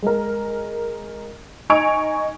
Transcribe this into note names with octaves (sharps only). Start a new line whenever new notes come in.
G#3 A#4
D#4 G#5 C#6 G#6 D7 F7